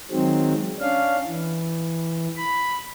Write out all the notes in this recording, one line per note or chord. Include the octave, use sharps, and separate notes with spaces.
D#3 F#3 G#3 C4
C#4 D4 F5
E3
B5